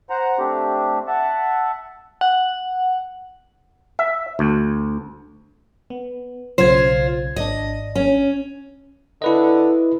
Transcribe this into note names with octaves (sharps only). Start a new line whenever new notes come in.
C5 F#5 A#5
A3 C4 D4 G4
E5 F#5 A5
F#5
E5
D2
B3
B1 C#3 F4 C5 G#6
G#1 D4 D#5
C#4
D3 E4 B4 D#5